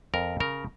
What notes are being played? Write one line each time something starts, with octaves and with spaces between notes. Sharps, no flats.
F2 A#4
C#3 A#4